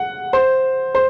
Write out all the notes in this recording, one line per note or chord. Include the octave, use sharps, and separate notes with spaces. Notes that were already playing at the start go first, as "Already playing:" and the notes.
Already playing: F#5
C5
C5